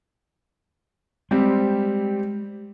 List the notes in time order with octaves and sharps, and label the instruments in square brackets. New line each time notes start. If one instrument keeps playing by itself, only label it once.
[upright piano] G3 C4 G4 [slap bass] G#3